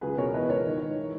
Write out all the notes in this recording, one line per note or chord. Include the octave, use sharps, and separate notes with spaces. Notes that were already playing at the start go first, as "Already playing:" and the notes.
C#2 G#4 B4
B2 A#4 C#5
E3 B4 D#5
E3 A#4 C#5
D#3
D#3
E3